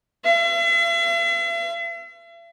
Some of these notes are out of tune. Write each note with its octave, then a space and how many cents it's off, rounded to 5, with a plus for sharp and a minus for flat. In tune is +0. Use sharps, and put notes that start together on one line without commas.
E5 +45